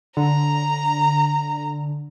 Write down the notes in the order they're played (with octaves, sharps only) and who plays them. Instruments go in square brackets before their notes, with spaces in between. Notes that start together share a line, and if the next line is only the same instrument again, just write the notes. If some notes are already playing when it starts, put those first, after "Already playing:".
[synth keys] D3 [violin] A#5